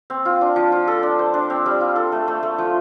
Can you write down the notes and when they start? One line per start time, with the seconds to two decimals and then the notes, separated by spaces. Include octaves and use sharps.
0.10 C4
0.25 F4
0.41 D4
0.56 F3
0.72 F4
0.88 A4
1.03 D4
1.19 C5
1.34 D4
1.50 C4
1.66 G3
1.81 F4
1.96 A4
2.12 A3
2.28 A3
2.43 A3
2.58 F3